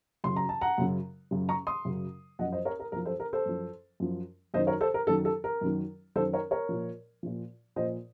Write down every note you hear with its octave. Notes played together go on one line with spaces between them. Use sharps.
F#2 C#3 F#3 C6
A#5
A5
F#5 A#5
F#2 C#3 F#3
F#2 C#3 F#3
A#5 C#6
C6 D#6
F#2 C#3 F#3
F#2 F3 D#5 F#5
C5 D#5
A#4 C#5
A#4
F#2 F3 A#4
A4 C5
A#4
A4 C5
F#2 F3
F#2 F3
F#2 D#3 F#3 C5 D#5
A#4 C#5
A4 C5
A#4
F#2 D#3 F#3 A4
A4
A#4
F#2 D#3 F#3
F#2 D#3 F#3 A4 C5
A#4 C#5
A#4 C#5
A#2 F3
A#2 F3
A#2 F3 C5 D#5